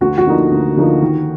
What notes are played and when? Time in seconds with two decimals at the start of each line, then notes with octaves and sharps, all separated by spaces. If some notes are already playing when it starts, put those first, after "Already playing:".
0.01 D2 F#4
0.18 F#4
0.26 D3 F3 A#3 D#4
0.51 D2
0.77 D3 F3 A#3 D#4
1.02 D#3